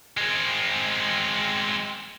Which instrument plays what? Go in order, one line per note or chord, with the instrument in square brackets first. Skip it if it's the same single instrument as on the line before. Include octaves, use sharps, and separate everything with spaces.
[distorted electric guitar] G#3 C4